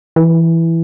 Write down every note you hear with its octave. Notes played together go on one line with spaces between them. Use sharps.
E3